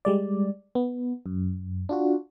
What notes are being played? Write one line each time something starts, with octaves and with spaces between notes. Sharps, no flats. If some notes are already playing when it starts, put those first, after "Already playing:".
G3 G#3 D5
B3
F#2
D4 F4 F#4